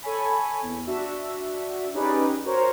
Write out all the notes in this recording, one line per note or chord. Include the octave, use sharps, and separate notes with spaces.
A4 C#5 G#5 B5
E2
D4 F#4 E5
C#4 D#4 G4 G#4 B4 D5
F#4 A#4 C5 C#5 A#5